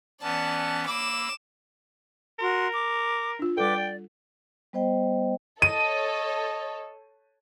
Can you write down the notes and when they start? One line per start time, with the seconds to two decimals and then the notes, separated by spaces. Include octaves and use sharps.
0.22 E3 B3 C#4 D5 A5
0.86 A#3 B5 D6 E6 E7
2.39 F#4 A#4 C6
2.71 D6
3.39 D4 F4
3.57 G3 A4 B4 D5 G5 D6
3.75 D5
4.73 G3 B3 C5 D#5 G5
5.62 A4 C#5 D#5 D#7